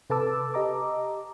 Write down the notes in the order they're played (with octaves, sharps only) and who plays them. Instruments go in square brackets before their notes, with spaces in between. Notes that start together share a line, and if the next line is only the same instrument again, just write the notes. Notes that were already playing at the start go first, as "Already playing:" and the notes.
[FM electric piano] C3 A4 B4 A5 D6 E6
G4 D#5 A#5 D6